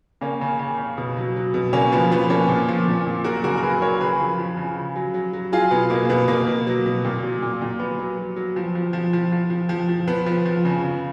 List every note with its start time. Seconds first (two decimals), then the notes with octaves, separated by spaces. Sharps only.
0.21 C#3 A#3 C#4
0.41 C#3
0.59 C#3
0.78 C#3
0.97 B2
1.17 F#3
1.36 F#3
1.54 B2
1.73 C#3 A#3 C#4
1.92 F3 B3
2.11 F3 B3
2.30 F3 A#3 C#4
2.49 A#2
2.68 F3
2.87 A#2
3.06 A#2
3.24 F#3 F#4 A#4
3.44 C#3 F#4 A#4
3.57 A#4
3.62 F#3 G#4 B4
3.81 F#3 A#4 C#5
4.00 C#3 G#4 B4
4.20 F3
4.38 F3
4.57 C#3
4.77 C#3
4.96 F#3
5.14 F#3
5.33 F#3
5.52 F#3 F4 G#4
5.71 B2 B3
5.90 B2 A#3
6.05 A#3
6.09 B2 B3
6.28 B2 A#3
6.47 B2
6.67 F#3
6.86 B2
7.05 A#2
7.23 F#3
7.42 A#2
7.61 A#2
7.79 F#3 B3
7.99 F#3
8.18 F#3
8.36 F#3
8.56 F3
8.75 F3
8.93 F3
9.13 F3
9.32 F3
9.50 F3
9.69 F3
9.89 F3
10.08 F3 B3
10.26 F3
10.45 F3
10.65 C#3
10.83 C#3